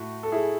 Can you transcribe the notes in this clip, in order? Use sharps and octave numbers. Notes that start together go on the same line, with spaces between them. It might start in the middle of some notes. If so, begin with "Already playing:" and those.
Already playing: A2 A3 F#4
A4
E4 G#4